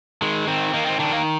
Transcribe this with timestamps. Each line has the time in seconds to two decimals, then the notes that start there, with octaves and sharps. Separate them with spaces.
0.22 D#3 G#3
0.47 D#3 C4
0.73 D#3 A#3
0.86 C4
0.99 D#3 D4
1.13 A#3